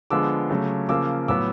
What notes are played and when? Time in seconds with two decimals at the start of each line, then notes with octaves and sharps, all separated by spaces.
0.10 D3 F3 G#3 B3 D6 E6
0.49 C#3 F#3 A3
0.89 C#3 F3 A#3 D6 E6
1.28 A2 F#3 B3 D6 E6